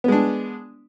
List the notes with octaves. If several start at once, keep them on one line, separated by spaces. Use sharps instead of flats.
G#3 B3 D4